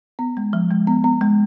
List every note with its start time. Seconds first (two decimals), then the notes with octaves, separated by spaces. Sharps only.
0.19 B3
0.37 G#3
0.53 F3
0.71 G#3
0.87 B3
1.04 B3
1.21 G#3